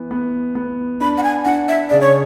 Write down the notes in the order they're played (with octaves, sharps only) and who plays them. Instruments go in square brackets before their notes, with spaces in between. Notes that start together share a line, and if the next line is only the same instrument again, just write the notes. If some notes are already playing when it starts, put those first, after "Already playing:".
Already playing: [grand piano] E3 B3
B3
B3
[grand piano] D4 [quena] B5
[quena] F#5
G#5
[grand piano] D4 [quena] F#5
[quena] E5
[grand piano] C#3 [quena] D5
[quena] C#5